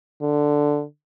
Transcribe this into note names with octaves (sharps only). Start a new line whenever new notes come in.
D3